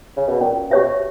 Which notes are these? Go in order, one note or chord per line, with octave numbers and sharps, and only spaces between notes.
C#3
B2
A#2 C#4
B2 G4 C#5 E5